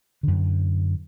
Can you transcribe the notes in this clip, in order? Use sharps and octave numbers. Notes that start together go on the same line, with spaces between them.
F#2 D3